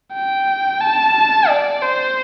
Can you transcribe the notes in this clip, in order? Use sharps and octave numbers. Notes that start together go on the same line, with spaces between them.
G5
A5
D5
C5